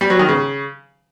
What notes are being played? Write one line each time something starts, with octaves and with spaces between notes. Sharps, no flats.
G3
F#3
D#3
C#3